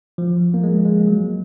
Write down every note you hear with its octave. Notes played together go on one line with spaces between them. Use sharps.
F3
A#3
G#3
G#3
F#3